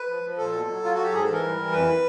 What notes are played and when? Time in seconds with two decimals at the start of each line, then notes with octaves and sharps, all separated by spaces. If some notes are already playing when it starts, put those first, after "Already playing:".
Already playing: B4
0.08 F3
0.23 F3
0.38 A#2 A4
0.53 B2
0.68 F#3
0.83 F#3 F4
0.94 F#3 F#4
1.03 G4
1.12 G#2 G#4
1.23 E3 A4
1.33 A#4
1.42 G3
1.57 E3
1.72 F2 B4